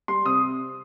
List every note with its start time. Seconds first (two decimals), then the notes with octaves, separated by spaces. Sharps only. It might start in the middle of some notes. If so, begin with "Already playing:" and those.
0.08 G3 C6
0.25 C3 D#6